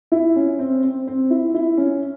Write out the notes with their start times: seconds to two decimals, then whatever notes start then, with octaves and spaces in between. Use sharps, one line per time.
0.12 E4
0.36 C#4
0.59 C4
0.83 C4
1.07 C4
1.30 E4
1.54 E4
1.77 C#4